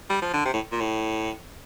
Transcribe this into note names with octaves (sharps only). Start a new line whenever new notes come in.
G3
F3
D3
C3
A2
A#2
A2